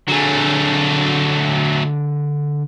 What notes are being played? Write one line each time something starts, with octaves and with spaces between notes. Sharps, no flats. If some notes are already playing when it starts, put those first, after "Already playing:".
D3 F#3 A3 G#4